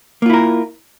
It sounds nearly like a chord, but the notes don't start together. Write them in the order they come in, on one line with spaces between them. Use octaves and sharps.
A#3 F4 E4 A#4